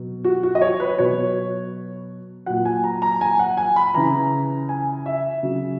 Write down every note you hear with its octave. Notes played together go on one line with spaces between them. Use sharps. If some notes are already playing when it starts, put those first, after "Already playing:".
Already playing: B2 F#3
F#4
F#4
D#5
C#5
B4
B2 F#3 C#5
A#2 F#3 F#5
G#5
A#5
A#5
G#5
F#5
G#5
B5
C#3 E3 A#5
G#5
E5
C#3 F#3